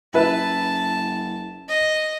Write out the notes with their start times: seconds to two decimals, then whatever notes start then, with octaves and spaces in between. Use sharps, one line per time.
0.14 F#1 E4 B4 A5
1.69 D#5